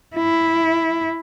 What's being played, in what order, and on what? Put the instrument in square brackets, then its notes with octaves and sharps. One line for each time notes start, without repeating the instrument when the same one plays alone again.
[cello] E4